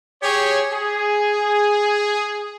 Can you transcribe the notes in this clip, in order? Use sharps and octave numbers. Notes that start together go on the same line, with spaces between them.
G4 G#4 C#5
G#4